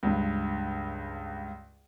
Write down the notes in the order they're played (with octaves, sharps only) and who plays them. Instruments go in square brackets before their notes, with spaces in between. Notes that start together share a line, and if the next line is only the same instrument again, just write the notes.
[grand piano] C#2 G2